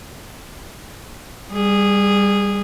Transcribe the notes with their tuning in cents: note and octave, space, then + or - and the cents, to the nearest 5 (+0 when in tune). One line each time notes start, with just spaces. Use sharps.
G3 +25 G#4 -10